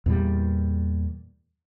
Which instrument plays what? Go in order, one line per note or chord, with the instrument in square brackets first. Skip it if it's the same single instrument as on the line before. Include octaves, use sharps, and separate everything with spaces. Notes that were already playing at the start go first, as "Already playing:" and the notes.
[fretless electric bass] E2 A#2 G3